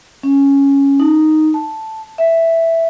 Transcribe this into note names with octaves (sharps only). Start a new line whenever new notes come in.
C#4
D#4
A5
E5